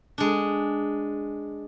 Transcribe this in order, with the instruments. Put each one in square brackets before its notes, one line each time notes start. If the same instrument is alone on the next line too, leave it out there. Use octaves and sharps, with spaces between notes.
[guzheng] G#3 D4